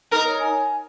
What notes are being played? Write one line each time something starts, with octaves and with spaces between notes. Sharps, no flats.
D#4 A#4
C#5
G#5